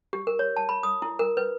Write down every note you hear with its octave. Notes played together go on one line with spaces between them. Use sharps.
G4
A#4
C#5
A5
B5
D#6
E4
A#4
B4